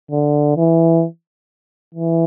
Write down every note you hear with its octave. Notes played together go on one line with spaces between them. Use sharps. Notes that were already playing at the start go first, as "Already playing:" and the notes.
D3
E3
E3